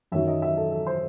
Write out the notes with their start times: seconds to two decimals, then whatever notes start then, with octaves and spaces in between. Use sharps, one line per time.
0.12 F#2 D#3 F#3 E5
0.27 D#5
0.42 E5
0.57 A4
0.71 A4
0.87 C5